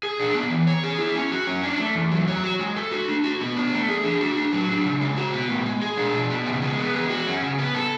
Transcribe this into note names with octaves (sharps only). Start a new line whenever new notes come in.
G#4
D4
B3
E3
C#5
G#4
E4
C#4
F#4
C#4
D4
A3
E2
F#3
C#5
F#4
G#3
A4
F#4
D4
F#4
B3
D4
A3
G#4
D4
F#4
D4
F#3
D4
C#3
G#3
F#4
B3
A2
G#3
G#4
D4
B2
B3
C#3
G#3
B3
G#3
F#4
C#4
C#3
B3
A4